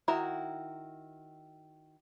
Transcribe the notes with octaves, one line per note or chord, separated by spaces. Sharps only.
D#3 E4 F#4 A#5